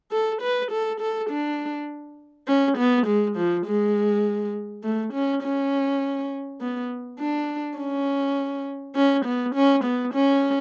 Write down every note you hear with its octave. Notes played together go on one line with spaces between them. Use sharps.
A4
B4
A4
A4
D4
C#4
B3
G#3
F3
G#3
A3
C#4
C#4
B3
D4
C#4
C#4
B3
C#4
B3
C#4